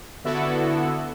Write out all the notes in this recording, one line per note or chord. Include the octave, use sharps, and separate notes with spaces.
D3 B3 E4 F#4 A4